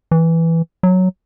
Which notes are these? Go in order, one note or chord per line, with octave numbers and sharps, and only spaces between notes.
E3
F#3